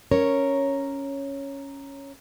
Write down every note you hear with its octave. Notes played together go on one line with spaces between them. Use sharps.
C#4 A#4 C#5